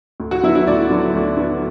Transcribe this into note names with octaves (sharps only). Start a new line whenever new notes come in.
D2
F#4
D3 F#3 B3 E4
E4
D2 D5
D3 F#3 B3
D2
D3 F#3 B3